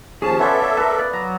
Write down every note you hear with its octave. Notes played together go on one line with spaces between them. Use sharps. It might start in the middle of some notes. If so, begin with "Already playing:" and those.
D#2 F3 C#4 G#4 A5
B3 F4 A4 C#5 D5 E5 A5
C#5
A#4 B4 A5
D5
F#3 A#5